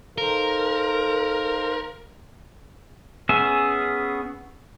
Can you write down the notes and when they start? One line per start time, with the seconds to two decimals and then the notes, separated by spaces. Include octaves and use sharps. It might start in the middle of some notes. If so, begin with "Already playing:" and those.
0.18 D#4 A4 A#4 C5 F5
3.29 B3 C#4 G#4 E5